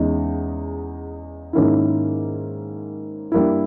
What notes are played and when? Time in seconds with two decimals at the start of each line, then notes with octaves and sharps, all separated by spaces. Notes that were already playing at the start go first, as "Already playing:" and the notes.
Already playing: E2 C#3 G#3 D#4
1.53 G#2 D#3 A#3 C#4 E4
3.32 G2 G3 A#3 E4